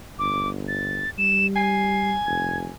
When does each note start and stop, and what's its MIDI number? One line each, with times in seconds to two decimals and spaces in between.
0.19 1.04 31
0.19 0.48 86
0.68 1.10 93
1.18 2.16 55
1.18 1.47 100
1.56 2.75 80
1.56 2.11 96
2.26 2.69 29
2.26 2.57 92